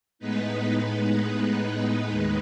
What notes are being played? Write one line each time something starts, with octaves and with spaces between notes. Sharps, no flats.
A2 G#3 B3 D#4 B4
B4
D#2 D#3 G#3